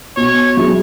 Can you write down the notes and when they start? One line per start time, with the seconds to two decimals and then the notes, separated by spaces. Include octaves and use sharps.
0.16 B2 C#5
0.57 F#3 E4 G#4